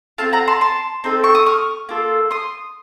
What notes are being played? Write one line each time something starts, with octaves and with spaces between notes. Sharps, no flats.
C4 F4 A4 F5 A5
F#5 A#5
A5 C6
A5 C6
C4 D#4 A4
C#6
D#6
C#6 F6
A#3 F4 A4
C6 D#6